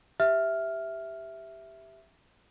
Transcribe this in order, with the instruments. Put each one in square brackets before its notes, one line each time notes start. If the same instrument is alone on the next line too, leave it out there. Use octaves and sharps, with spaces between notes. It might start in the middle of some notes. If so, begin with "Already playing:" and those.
[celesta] G4 E5 F6